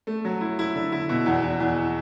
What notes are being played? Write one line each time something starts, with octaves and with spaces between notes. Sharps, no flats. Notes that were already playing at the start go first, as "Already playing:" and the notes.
A3
F#3
E4
E4
D3
E4
B2
E2
E2
E2